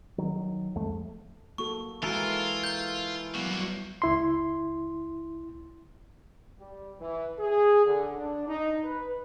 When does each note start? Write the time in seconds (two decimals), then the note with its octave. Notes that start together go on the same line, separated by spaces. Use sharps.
0.18 D#3 F#3
0.75 C2 F2 G#3 A3
1.58 A#3 F#4 A4 C#6
2.03 E3 G#3 F4 F#4 A4 A#4
2.64 G6 G7
3.35 F#3 G3 A#3 B3 F#4
4.02 C#2 E4 C6
6.59 G3
7.00 E3
7.39 G#4
7.85 D3
8.16 D4
8.47 D#4
8.84 B4